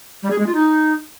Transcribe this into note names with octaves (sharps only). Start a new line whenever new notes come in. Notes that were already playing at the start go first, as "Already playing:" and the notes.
G3
G#4
G#3
F4
D#4